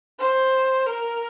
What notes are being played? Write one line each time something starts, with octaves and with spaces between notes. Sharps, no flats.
C5
A#4